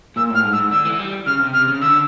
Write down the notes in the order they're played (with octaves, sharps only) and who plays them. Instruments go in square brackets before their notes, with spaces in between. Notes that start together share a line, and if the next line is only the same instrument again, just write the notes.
[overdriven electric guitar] A#2 [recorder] E6
[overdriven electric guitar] A2 [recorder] F6
[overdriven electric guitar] G#2
[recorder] E6
[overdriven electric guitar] G#2
[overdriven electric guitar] D3 [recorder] E6
[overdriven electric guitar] E3
G3
[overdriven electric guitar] C#3 [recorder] F6
[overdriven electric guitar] C3
[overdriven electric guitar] C3 [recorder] F6
[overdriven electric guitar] C#3
[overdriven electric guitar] D3 [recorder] E6